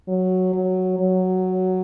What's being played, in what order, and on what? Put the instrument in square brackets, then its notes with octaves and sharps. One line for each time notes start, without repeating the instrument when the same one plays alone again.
[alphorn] F#3
F#3
F#3